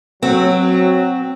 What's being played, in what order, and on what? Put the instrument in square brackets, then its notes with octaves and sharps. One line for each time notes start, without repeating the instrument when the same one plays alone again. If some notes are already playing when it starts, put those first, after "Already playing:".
[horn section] F#3 [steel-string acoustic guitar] C4